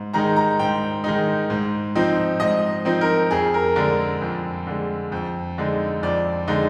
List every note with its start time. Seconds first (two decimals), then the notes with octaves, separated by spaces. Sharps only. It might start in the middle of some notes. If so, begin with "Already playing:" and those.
Already playing: G#2
0.14 D#3 G#3 D#4 A#5
0.36 A#5
0.59 G#2 G5
1.04 D#3 G#3 D#4
1.50 G#2
1.95 F3 C4 D#4
2.40 G#2 D#5
2.85 F3 C4 D#4
3.01 A#4
3.31 F2 G#4
3.54 A#4
3.76 D3 G#3 A#4
4.22 F2
4.67 D3 G#3
5.12 F2
5.58 D3 G#3 D#4
6.03 F2 D5
6.48 D3 G#3 D#4